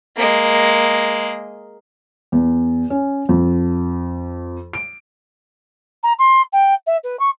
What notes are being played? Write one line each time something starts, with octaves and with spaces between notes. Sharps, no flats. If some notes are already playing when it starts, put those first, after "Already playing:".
G#3 A#3
E2
C#4
F2
D7
A#5
C6
G5
E5
B4
C#6